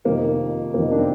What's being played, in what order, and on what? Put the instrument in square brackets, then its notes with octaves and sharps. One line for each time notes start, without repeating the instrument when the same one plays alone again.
[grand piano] F2 C3 D#3 A#3
F2 C3 D#3 A#3
D4
C4